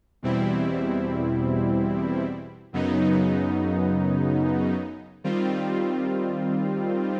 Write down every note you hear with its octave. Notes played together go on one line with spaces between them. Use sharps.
E2 B2 G3 C4 E4
F#2 C#3 F#3 B3 D#4
D#3 G3 C4 F4